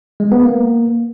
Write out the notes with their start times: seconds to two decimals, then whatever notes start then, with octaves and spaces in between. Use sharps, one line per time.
0.20 G#3
0.32 B3
0.43 A#3